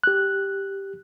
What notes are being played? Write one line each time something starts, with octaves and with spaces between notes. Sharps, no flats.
G4 F#6